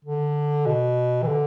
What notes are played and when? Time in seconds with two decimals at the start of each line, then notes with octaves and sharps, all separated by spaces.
0.05 D3
0.66 B2
1.23 E3
1.27 D3